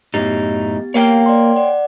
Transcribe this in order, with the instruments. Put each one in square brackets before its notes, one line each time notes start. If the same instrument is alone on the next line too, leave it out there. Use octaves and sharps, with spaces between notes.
[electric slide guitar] F#2 A2 D#4 [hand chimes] B3 G4 A6
[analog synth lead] A#3 [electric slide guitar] C#5 F5 G5
[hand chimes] D5 C6
D5 F#5